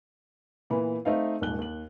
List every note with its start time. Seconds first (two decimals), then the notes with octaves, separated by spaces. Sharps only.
0.70 A#2 E3 B3 B5
1.05 A3 C4 D#4 D#5 F5
1.41 D#1 D#2 G#2 F#6 G7
1.58 D#2 F#7